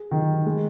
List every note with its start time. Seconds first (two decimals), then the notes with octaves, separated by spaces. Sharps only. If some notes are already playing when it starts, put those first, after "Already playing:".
Already playing: G#4
0.11 D#3
0.46 G#3